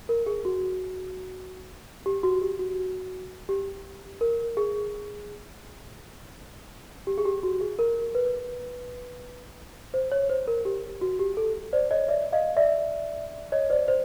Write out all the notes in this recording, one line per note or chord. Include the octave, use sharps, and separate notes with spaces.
A#4
G#4
F#4
G4
F#4
G4
F#4
G4
A#4
G#4
G4
G#4
G4
F#4
G#4
A#4
B4
C5
C#5
C5
A#4
G4
F#4
G4
A4
C5 D5
C#5 D#5
D5 E5
D#5 F5
D5 E5
C#5 D#5
C5 D5
C5 D5